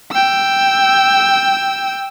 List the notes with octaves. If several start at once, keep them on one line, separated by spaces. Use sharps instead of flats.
G5 E6